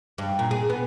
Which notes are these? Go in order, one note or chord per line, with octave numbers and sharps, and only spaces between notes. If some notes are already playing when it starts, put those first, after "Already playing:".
G2
A#2
G#4
B3